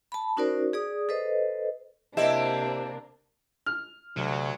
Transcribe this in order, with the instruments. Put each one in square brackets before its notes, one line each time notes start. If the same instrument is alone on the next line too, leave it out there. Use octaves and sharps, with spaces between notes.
[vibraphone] A5 B5
C#4 D#4 F#4 A#4 C5 D5
G#4 D5 D#6
A4 B4 C5 D#5
[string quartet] C3 A#3 D4 [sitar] C4 E4 G4 [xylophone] D#5 [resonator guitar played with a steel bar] E5
[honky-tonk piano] F6
[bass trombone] D2 [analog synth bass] C3 [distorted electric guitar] F#3